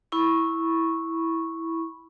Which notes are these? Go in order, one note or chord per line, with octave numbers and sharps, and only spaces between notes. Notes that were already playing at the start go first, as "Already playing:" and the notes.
E4 B5 C#6